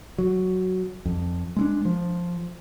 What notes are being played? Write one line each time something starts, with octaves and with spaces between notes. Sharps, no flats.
F#3
F2
G#3 C4 D4
F3